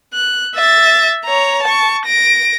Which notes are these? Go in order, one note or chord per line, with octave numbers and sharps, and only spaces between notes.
F#6
E5 A6
C#5 A#5
A5 C#6
A#6 D7